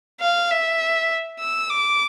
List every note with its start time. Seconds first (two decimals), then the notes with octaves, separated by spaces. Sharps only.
0.21 F5
0.51 E5
1.39 E6
1.70 D6